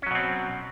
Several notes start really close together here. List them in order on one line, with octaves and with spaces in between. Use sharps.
C#4 F#3 B2 C4